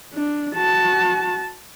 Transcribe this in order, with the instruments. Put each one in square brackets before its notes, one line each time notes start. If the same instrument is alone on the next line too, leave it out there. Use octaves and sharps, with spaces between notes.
[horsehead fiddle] D4
F#4 A5